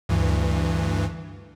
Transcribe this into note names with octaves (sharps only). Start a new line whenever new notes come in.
D2 G2 E3